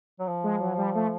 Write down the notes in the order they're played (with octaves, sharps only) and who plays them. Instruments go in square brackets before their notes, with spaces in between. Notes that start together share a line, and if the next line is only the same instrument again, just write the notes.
[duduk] F#3
F3
[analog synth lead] G#3
F#3
G3
A3